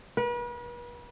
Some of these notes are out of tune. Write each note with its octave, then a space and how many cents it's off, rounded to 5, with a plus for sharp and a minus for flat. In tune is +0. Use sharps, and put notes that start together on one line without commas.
B4 -40